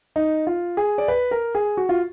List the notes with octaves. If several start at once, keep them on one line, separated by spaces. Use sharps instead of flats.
D#4
F4
G#4
D5
B4
A#4
G#4
F#4
F4